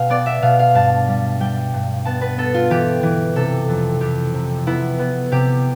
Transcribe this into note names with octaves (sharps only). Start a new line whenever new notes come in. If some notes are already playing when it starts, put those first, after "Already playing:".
Already playing: B2 F5 G5
B3 D5
E5
B2 F5
F5
G2 A5
G3
G3 G5
G2
B3 A5
B4
B3 A4
F4
E3 G4
E3
C3 A4
F2
F2 G4
C3
B3 E4
B3
C3 G4